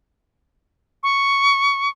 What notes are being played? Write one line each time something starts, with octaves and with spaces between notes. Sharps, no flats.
C#6